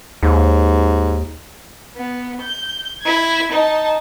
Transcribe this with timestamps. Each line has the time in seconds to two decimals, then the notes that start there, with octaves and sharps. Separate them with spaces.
0.23 D#2 G#2
1.96 B3
2.41 G6
3.03 E4 G#6
3.52 D#4 A5